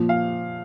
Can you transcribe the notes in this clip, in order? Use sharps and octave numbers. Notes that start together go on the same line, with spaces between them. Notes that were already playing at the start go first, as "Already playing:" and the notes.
Already playing: A#2 F3
F5